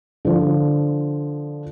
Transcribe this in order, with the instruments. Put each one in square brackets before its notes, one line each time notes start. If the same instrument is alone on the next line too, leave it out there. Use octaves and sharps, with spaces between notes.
[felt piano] D3 F3